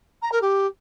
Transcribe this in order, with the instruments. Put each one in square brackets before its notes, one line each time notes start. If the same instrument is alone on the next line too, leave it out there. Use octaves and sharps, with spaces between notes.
[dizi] A#5
A#4
G4